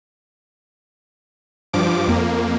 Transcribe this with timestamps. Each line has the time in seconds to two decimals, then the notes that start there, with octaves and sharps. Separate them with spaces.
1.73 G2 F3 D6
2.08 F2 A#3